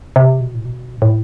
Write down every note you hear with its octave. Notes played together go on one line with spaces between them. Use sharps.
C3
B2
A2
B2
G2
A2